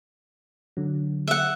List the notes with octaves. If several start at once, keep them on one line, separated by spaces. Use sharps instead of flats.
D3 F#3
E5 F#5